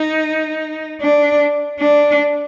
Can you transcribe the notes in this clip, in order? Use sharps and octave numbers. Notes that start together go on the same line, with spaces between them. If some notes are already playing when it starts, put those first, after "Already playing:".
Already playing: D#4
D4
D4